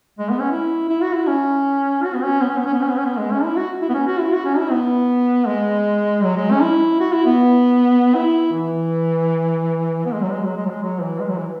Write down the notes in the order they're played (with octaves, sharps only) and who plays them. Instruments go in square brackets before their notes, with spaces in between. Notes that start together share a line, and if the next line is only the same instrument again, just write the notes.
[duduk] G#3
B3
C#4
E4
E4
F#4
E4
C#4
F#4
B3
C#4
B3
C#4
B3
C#4
B3
C#4
B3
C#4
B3
G#3
C#4
E4
F#4
E4
B3
C#4
F#4
E4
F#4
C#4
E4
B3
G#3
F#3
G#3
C#4
E4
F#4
E4
B3
E4
E3
B3
G#3
F#3
G#3
F#3
G#3
F#3
G#3
F#3
E3
G#3
F#3
E3